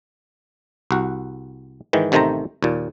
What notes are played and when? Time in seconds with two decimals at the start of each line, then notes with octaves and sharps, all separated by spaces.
0.91 C2 F#4
1.93 G#2 D#3 E3
2.12 A1 C3 D#3 A3 C5 A#5
2.63 D#2 A#2